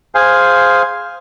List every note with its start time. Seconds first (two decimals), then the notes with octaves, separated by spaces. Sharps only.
0.15 G#4 C5 F5 G#5